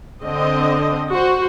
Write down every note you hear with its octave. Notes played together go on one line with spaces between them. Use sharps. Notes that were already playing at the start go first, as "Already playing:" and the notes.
D3 C4 D#5
F#4 C5